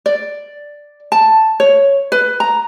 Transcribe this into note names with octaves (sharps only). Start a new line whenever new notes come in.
D5
A5
C#5
B4
A#5